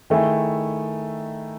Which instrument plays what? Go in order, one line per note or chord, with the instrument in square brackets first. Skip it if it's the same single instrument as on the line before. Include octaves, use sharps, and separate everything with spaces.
[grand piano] D#3 A3 E4 G#4